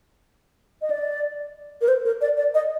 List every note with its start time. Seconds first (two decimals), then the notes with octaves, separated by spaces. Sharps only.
0.82 D#5
0.90 D5
1.81 A#4
1.88 C5
2.05 A#4
2.21 D5
2.37 D5
2.54 D#5